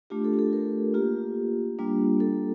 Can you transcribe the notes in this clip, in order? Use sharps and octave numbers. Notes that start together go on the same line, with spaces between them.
A3 D4 F4 G4
A4
G4
A4
A#4
A#3 F4 G4
G3 A#3 D4 F4
A4